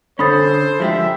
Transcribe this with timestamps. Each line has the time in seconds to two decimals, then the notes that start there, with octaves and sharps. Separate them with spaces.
0.19 D3 C#4 A4 C5 B5 D#6 A6
0.80 F#2 D3 F3 G#3 G4 E5